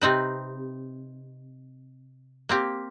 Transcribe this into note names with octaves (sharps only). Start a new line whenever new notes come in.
C3 C4 D#4 B4
A#3 C4 G4